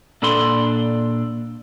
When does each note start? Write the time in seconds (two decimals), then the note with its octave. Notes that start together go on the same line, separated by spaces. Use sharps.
0.22 A#2 D4 A4 B5 C6